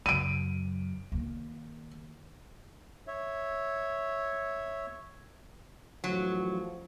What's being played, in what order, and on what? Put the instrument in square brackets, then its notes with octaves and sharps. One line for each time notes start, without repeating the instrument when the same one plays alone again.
[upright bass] F#2 C#3 [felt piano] D7 D#7
[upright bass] D#3 A#3
[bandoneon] C#5 E5
[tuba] A1 [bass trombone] F3 [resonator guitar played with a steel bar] F#3